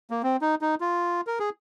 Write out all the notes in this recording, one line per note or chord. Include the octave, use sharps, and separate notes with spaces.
A#3
C4
D#4
D#4
F4
A#4
G#4